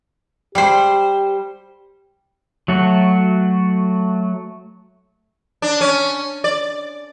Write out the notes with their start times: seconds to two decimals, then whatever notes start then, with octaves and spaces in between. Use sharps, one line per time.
0.55 G3 G4 C5
2.68 F#3 A3 F#4
5.62 D4
5.81 C#4
6.44 D5